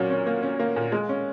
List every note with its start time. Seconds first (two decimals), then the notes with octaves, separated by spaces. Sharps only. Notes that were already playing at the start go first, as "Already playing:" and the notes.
Already playing: A#2 F#3 C#4
0.10 C#4
0.26 A#3
0.43 C#4
0.60 A#3
0.76 A#2
0.92 G#3
1.09 C#4